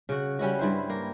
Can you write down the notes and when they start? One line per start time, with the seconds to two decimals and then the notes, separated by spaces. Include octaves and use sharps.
0.09 C#3 F#4
0.39 G3 C#4 E4 F#4
0.59 G2 E4 C5
0.90 A#3